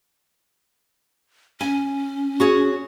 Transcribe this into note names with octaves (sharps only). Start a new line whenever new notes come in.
C#4 G#5
F#4 G#4 C#5